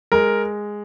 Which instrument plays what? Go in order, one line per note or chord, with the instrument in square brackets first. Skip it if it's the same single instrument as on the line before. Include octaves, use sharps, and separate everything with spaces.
[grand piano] G#3 A#4